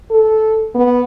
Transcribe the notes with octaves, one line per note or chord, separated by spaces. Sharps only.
A4
B3